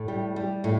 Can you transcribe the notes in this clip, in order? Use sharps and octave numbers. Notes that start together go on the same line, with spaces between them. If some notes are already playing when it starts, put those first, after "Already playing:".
Already playing: A2
G3
G3
A2